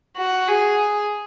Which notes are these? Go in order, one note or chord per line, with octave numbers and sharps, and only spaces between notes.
F#4
G#4